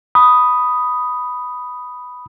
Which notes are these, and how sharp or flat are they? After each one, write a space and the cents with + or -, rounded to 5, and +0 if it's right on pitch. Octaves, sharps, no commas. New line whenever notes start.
B5 +0 D#6 +0